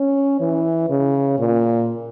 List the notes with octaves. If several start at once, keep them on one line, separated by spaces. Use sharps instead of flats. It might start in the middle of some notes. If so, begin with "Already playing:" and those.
Already playing: C#4
E3
C#3
A#2